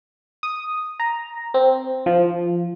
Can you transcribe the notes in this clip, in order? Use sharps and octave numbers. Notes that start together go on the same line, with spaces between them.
D#6
A#5
C4
F3